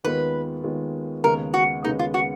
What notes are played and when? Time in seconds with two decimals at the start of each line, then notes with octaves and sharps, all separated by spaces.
0.04 D#2 D#3 G#3 B3 F4 B4
0.64 D#2 D#3 G#3 B3 F4
1.24 D#2 C#3 G#3 B3 A#4
1.54 F#4
1.84 D#2 C#3 G#3 B3 D#4
1.99 F4
2.14 F#4